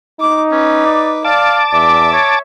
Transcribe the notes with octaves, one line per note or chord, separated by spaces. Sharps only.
D#4 D6
C#4 B4 D6
D5
D5 F5 A5 D6
E2 D5 E5
C#5